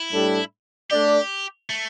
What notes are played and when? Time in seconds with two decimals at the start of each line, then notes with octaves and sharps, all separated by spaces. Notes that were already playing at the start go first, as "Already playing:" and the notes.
Already playing: E4
0.12 A2 G3 D4 A4
0.90 A3 D4 G4 A4 D5
1.70 A3